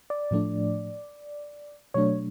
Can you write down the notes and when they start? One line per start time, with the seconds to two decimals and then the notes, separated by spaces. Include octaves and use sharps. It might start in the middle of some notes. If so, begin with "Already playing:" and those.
0.10 D5
0.31 A2 F3 A3 D4
1.94 B2 F#3 A3 D4 C#5